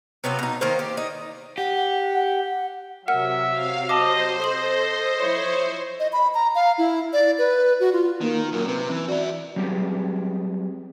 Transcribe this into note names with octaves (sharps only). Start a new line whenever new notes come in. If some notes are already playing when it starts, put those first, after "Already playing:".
C3 F#3 B3 F4
B2 D#4
D#3 A#3 C5
G4
D#4
G4 F#5
C3 F#3 A#4 E5 F#5 F6
F5
C5 D#5 A5 D6
A4 D#5 C6 D#6 F#7
F3 E4 C#5
D#5
B5
A#5
F5
E4
D5
B4
F#4
F4
D#3 A#3
F#2 A#2 A#4
C3 B4
E3
F#4 D5 E5
F#3 G3 C4 G4 G#4 B4